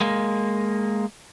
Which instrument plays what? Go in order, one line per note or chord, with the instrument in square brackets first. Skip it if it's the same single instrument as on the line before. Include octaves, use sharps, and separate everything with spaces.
[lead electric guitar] G#3 A#3